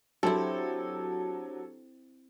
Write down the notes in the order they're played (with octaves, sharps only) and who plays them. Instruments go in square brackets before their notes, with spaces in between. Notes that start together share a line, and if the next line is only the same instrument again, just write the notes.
[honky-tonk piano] F#3 [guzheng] C4 E4 [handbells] D4 G4 C5 [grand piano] A4